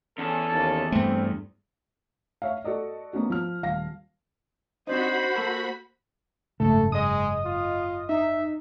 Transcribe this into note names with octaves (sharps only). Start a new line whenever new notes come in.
E2 C#4 A4
D#2
G2 A3 C4
C#5 E5 F5
F#4 A4 D5 D#5
A#3 B3 C#4 F#4
F3 F6
D#1 F5 A#6
C4 D4 D#4 F#4 C5 B5
A#3 A4 A#4
F#1 G#2 C#3 A3 A4
G#3 D#5 D#6
F4
D#4 E5